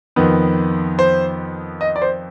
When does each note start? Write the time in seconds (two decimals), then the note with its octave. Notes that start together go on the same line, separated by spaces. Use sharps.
0.16 F2 D#3 B3
0.99 C5
1.81 D#5
1.96 D5
2.02 C5